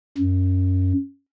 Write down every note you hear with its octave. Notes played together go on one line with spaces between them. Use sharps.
F#2